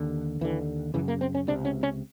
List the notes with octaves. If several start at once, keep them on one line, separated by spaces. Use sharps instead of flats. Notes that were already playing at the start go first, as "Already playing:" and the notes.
Already playing: D#2 D3
D#2 D3 E3
F#2 C#3 E3
A#3
C4
C#4
C#2 C3 D4
C#4
C#4